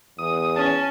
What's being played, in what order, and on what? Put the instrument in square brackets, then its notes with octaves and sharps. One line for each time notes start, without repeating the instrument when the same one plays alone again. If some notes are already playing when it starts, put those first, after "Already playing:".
[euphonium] E2 [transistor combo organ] D#6
[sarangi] C#4 [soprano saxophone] A5